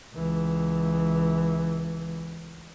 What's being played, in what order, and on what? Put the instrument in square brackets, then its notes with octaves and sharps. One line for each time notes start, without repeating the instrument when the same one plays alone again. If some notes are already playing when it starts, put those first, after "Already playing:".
[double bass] C#2 E3